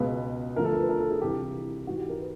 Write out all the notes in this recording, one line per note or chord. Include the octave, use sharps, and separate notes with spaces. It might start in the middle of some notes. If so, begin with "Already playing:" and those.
Already playing: C#2 B2 B4
D2 D3 F3 A#4
A4
A#4
B4
A#4
A4
G#4
C2 C3 E3 G4
G#2 E3 F#4
G4
A#4
B4